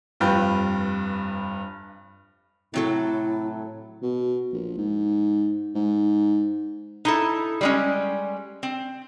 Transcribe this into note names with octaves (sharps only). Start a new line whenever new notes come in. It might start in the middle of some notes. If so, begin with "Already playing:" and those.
F1 G2 F4 B4 G5
A2 C3 F#3 E4 A4
B2
A#1
G#2
G#2
D#4 E4 A4
G3 G#3 C#4
C4